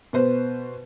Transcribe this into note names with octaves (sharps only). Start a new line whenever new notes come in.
B2 B4 C5